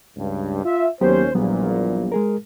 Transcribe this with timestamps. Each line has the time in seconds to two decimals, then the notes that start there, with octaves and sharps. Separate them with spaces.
0.17 C#2 G2
0.64 F4 E5
1.01 D#2 F#3 B3 C#4 G4 C5
1.35 A#1 E2 A#2 F#3 G3 B3
2.12 G#3 G#4 A#4